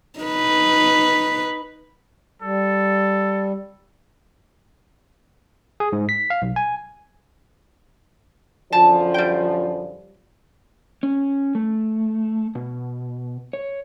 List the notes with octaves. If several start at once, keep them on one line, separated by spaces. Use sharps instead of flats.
D#4 B4
G3 A4
G#4
G#2
B6
F5
B1
G#5
F#2 D3 F3 A5
G3 G5
C#4
A3
B2
C#5